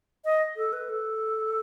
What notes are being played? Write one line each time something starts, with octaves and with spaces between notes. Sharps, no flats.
D#5
A4
B4
A4